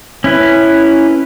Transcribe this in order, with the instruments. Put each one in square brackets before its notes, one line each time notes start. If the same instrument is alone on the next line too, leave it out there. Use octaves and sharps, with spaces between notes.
[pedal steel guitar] C#4 E4 B4